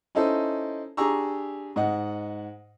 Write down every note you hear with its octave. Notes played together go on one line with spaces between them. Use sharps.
C#4 D#4 E4 A4 C5
D4 G4 G#4 A#5 C#6 E6
G#2 D#5 F#5